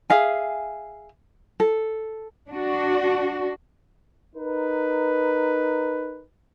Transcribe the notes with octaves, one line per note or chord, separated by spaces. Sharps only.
G#4 E5 F5 G#5
A4
D4 F#4
D#4 A#4 B4